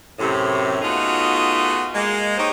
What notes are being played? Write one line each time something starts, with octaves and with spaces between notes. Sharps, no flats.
F#2 A2 C3
A3 B3 D#4 F4 F#4 G#4
G#3 A#3
D#4 G4 C5 C#5 D#5